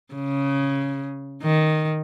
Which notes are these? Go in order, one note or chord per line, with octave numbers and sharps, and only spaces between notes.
C#3
D#3